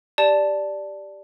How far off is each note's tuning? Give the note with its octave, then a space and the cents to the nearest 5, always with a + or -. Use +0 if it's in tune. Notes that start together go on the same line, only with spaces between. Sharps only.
G4 +0 D5 +0 A5 +0